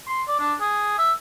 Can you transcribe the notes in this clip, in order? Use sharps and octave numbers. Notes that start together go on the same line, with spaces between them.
C6
D5
D4
G#4
E5